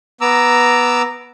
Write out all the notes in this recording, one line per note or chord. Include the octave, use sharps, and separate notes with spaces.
B3 A#5 D6 E6